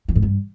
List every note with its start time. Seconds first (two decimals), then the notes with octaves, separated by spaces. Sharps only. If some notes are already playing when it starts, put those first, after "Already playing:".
0.08 E3
0.15 G#2
0.22 G2